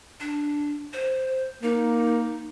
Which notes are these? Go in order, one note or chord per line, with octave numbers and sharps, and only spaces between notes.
D4
C5
A#3 D#4